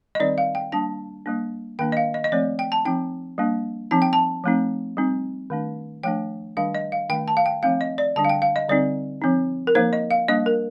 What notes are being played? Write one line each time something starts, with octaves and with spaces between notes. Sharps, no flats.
D#5
D#3 G3 C4 D#4 D5
F5
G5
G3 A#3 D4 A5
G3 A#3 D4
D#3 A#3 D4 G5
D#5
F5
D#5
D#5
F3 A3 C4 D5
G5
A5
F3 C4 D#4 G5
G3 A#3 D4
F3 C4 D#4 A5
G5
A5
F3 A3 C4 D#4
G3 C4 D#4
D#3 A3 D4
F3 A3 D4 G5
D#3 G3 D4 F5
D#5
F5
D#3 A3 D4 G5
A5
F5
G5
F3 A3 C4 D#4 F5
D#5
D5
D3 G3 D4 A5
F5
G5
F5
D#5
D3 G3 C4 D#4 D5
F3 C4 D#4
A#4
F3 A#3 D#4 C5
D#5
F5
G3 A#3 D4 D#5
A#4